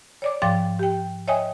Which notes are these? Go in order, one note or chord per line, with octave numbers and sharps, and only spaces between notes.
C#5 D5 D6
G#2 F3 F5 G5 D6 A6
G4 G5
C#5 D#5 E5 G5 G#5 D#6